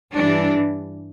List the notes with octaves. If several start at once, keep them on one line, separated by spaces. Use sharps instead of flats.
G2 E3 G3 D4